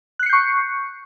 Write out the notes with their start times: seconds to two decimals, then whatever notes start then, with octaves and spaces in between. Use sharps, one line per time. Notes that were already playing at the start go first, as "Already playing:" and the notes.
0.19 F#6
0.23 C7
0.26 C#7
0.29 G6
0.33 C#6